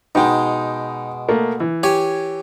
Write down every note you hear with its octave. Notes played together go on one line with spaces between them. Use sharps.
B2 G#3 D#4 G5
A3 A#3
E3
G4 C#5 G#5